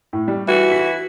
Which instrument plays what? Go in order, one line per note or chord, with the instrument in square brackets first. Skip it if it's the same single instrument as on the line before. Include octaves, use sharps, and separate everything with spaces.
[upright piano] A2
G3
[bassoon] E3 [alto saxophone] F#4
[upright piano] B6